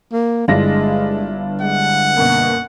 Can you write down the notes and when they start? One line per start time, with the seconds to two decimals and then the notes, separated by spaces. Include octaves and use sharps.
0.12 A#3
0.48 G1 G2 G#3 D4 E4 F4 A#6
1.61 G#3 F#5
2.16 F#2 B2 A#3